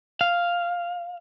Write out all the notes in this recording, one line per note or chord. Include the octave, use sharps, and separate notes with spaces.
F5